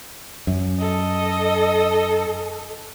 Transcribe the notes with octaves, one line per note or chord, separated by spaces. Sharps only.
F#2
A4 D#5